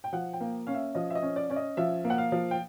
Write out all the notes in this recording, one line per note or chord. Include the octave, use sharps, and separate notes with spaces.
G5
F3 F#5
G5
A#3
C#4 F5
E5
F3 D#5
E5
D#5
C#4
D5
C#4 D5
D#5
F3 E5
A#3
F#5
F5
F3
G5